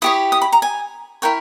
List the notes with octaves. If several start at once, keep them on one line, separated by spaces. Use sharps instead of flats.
E4 G4 C#5 D#6
D#6
B5
A#5
G#5
E4 A#4 C#5 G5